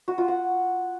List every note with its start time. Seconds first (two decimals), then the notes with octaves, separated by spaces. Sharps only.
0.08 F#4
0.18 F4
0.28 F#5